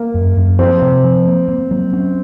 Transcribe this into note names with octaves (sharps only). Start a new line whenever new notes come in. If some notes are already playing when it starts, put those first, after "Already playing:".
Already playing: A#3
F#2
F#2
F3 C4
C3
F3
A#3
A#3
F#3
C#4